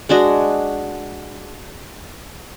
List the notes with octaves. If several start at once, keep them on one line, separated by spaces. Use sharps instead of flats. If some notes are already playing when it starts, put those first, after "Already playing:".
G#3 D4 F#4 D#5